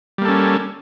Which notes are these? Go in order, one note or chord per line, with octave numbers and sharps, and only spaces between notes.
G3 A#3 C#4 A4